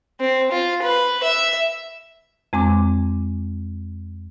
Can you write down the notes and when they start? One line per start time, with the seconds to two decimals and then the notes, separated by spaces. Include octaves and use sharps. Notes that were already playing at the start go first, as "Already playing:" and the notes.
0.20 C4
0.52 F4
0.83 B4
1.23 E5
2.53 F2 G#3 C4 D6